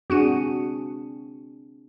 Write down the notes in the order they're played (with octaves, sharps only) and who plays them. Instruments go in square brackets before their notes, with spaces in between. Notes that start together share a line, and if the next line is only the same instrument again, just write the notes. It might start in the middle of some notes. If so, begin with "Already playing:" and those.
[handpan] C4 D4 G#4 [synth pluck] F#4 C#7 D#7